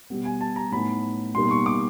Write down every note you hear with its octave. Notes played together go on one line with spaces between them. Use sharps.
B2 G3 B3
G#5
A5
A#5
A2 F#3 B3 D#4 B5
B2 G3 A#3 D#4 C6
C#6
D6